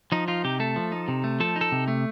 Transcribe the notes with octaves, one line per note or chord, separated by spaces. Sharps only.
F3 D#4
D#4 F4
C3 G4
A3 A4
F3
D#4
C3
A3
F3 A4
D#4
A4
C3
A3